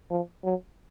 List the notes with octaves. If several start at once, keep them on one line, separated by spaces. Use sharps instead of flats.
F3
F#3